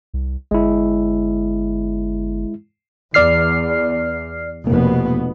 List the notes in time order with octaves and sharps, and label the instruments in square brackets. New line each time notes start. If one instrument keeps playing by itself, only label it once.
[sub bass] C2
[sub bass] G1 [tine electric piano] G#3 E4
[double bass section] E2 [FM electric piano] D5 F6 C7
[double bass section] F1 B2 B3 [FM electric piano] A#3